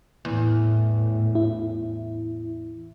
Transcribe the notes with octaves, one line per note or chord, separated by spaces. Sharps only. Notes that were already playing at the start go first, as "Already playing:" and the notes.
E2 A2
E4